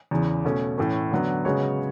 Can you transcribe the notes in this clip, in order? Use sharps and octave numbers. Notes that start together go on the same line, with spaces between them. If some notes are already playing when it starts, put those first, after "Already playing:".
E2 C#3 E3
B2 A3 C#4
A2 E3 A3 C#4
D3 F#3 B3
C#3 G#3 B3 F#4 C#5